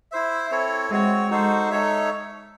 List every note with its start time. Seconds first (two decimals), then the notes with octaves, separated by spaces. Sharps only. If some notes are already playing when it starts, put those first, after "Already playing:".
0.12 E4 C5 E5
0.51 C4 E4 A4 C#5
0.90 G#3 C4 F#4 C#5
1.30 G#3 D#4 F#4 A4 C5
1.70 D#4 A4 C#5 E5